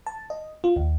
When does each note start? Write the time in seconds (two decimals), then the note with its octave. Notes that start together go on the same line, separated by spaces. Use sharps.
0.07 A5
0.30 D#5
0.64 F4
0.76 D#2